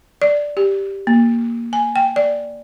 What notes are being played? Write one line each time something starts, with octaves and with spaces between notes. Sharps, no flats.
D5
G4
A#3
G#5
G5
D5